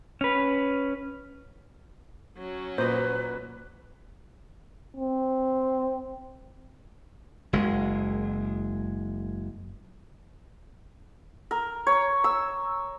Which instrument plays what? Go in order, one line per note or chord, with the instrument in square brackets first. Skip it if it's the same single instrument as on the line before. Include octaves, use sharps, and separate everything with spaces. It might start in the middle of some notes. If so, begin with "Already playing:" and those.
[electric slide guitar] C#4 B4
[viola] F#3 C#4
[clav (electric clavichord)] A#2 [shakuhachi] B4 [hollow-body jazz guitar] C5 D#5
[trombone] C4
[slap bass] F#1 G#3
[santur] A#4
C#5
E6